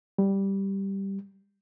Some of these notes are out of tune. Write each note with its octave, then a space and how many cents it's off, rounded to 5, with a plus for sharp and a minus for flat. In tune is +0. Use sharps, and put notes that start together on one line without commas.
G3 +0